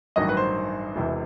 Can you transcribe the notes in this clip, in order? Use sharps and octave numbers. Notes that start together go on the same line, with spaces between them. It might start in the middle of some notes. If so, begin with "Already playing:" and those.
A1 G2 D#3 F#3 D#5
B4
C5
E1 E2 C3 E3